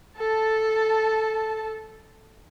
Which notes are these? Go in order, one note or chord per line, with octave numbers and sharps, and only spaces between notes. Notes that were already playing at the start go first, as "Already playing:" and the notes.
A4 A5